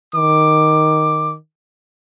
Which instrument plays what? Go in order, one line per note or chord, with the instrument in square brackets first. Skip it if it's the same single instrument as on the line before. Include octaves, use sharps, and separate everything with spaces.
[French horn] D#3 [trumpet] D6